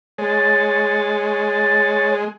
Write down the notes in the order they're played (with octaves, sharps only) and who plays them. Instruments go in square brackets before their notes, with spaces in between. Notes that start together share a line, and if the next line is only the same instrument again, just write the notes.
[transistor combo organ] G#3 [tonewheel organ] C#5 A6